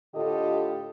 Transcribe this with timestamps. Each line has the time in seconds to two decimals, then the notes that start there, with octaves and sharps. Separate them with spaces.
0.14 A2 D3 F4 G4 A4 D#5